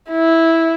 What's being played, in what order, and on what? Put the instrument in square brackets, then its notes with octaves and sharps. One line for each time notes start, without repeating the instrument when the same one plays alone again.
[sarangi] E4